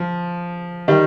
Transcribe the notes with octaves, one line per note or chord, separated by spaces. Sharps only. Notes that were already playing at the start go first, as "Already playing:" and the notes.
Already playing: F3
D#3 G3